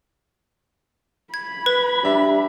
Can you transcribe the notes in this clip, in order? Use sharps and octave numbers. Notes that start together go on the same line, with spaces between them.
B5 G#6
B4
G3 D4 E5